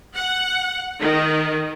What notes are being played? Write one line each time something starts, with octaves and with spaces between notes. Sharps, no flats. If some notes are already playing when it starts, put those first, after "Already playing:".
F#5
D#3